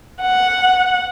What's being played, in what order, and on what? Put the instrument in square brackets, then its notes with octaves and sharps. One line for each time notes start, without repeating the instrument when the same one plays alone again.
[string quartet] F#5